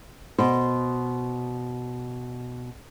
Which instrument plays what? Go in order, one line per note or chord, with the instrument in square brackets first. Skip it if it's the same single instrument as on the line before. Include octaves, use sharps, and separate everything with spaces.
[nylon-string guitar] B2 C5